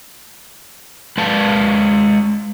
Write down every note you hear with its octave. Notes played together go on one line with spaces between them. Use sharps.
G#3 B4 F5 A5